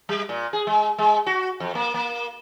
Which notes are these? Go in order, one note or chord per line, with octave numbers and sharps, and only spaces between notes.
G3
A#2
G#4
G#3
G#3
F#4
F2
A#3
A#3